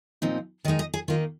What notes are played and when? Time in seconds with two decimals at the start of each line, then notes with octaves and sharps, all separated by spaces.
0.22 A#2 F3 C4 D#4
0.65 D#3 D#5
0.68 G#3 D#4
0.79 D#5
0.94 G#4
1.08 D#3 A#3 D#4 F4